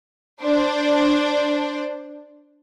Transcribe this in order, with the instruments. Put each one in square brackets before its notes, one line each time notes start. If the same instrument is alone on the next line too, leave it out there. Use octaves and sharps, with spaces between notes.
[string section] D4 C5